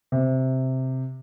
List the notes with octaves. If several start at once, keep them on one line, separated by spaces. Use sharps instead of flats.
C3